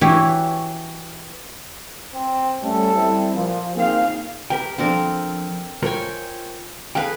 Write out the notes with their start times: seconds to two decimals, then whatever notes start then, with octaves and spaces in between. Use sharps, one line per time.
0.01 E3 E4 F#4 G4 B4 C#5
2.13 C4
2.63 G3 A3 C#4 A4
2.93 G3 C4 E4
3.35 A#2 F3
3.75 A#3 C4 D#4 F4 G#4 F5
4.50 G4 A#4 B4 G5
4.78 F3 C4 D4 A4 A#4
5.83 F4 A#4 C5 C#5 G5 G#5
6.95 G#4 A4 B4 F5 G5